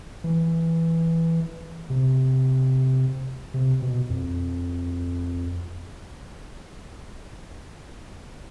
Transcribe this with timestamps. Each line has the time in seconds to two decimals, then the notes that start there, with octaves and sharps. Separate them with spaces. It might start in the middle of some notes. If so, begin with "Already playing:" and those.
0.24 E3
1.90 C3
3.54 C3
3.82 B2
4.10 F2